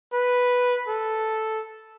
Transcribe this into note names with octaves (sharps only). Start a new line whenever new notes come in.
B4
A4